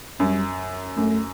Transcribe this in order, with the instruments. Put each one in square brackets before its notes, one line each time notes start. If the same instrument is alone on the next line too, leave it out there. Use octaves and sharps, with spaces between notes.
[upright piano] F#2 [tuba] G3
[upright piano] F#2 [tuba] A3